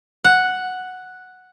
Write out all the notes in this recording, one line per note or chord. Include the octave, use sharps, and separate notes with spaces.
F#5